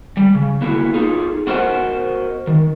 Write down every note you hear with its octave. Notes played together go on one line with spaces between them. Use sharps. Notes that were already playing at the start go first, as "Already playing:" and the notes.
G3
C#3
A#3 B3 E4 F#4 A4
D#4 F4 G#4 A4
B3 F#4 A#4 C5 D#5 F#5
D#3